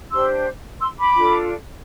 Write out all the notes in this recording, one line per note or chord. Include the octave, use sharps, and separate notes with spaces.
D4 G4 C5 C6 E6
C6 E6
B5 D6
D4 F4 A4